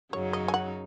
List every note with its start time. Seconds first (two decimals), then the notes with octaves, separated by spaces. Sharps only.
0.13 F#2 C#3 F#3 D#4 C#5
0.33 D#5
0.48 G#5
0.54 F#5